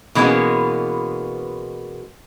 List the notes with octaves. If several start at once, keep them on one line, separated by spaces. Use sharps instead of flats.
B2 E3 G#3 A#3 B3 C#4